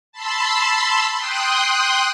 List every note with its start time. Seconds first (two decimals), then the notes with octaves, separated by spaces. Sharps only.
0.12 A5 B5 C6 E6
1.16 G5 C6 D#6 F#6